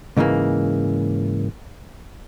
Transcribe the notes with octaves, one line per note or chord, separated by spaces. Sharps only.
G#2 C#3 E3 G#3 A#3